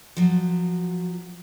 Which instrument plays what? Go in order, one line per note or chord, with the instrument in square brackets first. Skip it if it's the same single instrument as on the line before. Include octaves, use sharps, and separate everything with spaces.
[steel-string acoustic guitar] F3 F#3